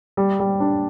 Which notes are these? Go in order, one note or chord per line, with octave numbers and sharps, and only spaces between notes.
G3
G3
D4